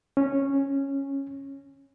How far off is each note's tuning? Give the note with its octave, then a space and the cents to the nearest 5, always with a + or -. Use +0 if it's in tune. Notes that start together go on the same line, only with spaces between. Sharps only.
C#4 -10